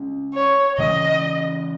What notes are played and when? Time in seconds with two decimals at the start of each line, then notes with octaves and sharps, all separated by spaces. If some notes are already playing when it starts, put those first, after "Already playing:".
Already playing: C#3 G#3 C#4
0.34 C#5
0.78 C#3 E3 G#3 C#4 D#5